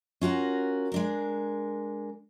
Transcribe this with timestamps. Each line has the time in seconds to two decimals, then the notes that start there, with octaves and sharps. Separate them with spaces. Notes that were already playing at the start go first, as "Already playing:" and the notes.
0.21 C#4 F4 F#4 A#4
0.92 G#3 D4 A#4